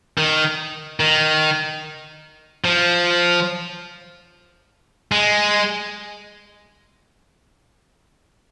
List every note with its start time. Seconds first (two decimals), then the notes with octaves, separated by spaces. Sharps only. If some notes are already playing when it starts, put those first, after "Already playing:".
0.18 D#3
1.00 D#3
2.65 F3
5.12 G#3